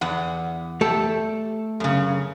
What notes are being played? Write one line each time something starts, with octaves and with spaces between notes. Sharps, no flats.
E2 F#5
A3 G4 A4
F#2 C#3